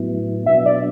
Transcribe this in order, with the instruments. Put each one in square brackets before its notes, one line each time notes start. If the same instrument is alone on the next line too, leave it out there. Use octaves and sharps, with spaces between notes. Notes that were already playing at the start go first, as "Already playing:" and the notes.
Already playing: [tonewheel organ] A2 F#3 B3 E4
[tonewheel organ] B2 F#3 B3 D4 [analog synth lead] E5
[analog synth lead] D5